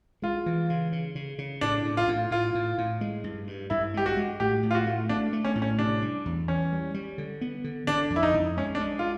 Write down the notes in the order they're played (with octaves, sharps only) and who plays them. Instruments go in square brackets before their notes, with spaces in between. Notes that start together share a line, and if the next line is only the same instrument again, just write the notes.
[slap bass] G#3 [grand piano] F4
[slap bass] E3
C#3
C#3
C#3
C#3
[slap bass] A2 [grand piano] D4
[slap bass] A2
[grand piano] F4
[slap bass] A2
[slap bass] A2 [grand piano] F4
[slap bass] A2
A2
G#3
G2
G2
[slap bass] G2 [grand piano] E4
[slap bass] G#3 [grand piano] G4
[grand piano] F#4
[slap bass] G#3
[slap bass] A2 [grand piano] G4
[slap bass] A2
[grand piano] F4
F#4
[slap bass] A3
[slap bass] A3 [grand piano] D4
[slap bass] A3
[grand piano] C#4
[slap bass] A2
[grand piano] C#4
[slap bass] C3 [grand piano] D4
[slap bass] G3
E2
[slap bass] E3 [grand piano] C#4
[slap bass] G3
G3
D3
B3
D3
[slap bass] D3 [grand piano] D4
[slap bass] F2
[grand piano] E4
D#4
[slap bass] F2
[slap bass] G#3 [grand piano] C#4
[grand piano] D4
[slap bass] G#3
[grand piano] F4